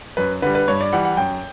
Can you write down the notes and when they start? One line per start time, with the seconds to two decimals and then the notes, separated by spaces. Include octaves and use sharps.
0.17 F#2 B4
0.42 D3 G3 B4
0.55 B4
0.68 G2 C#5
0.81 D5
0.93 E3 G3 F#5
1.05 F#5
1.17 F#2 G5